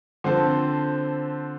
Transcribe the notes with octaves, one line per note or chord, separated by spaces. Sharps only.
D3 F3 C4 A4 C5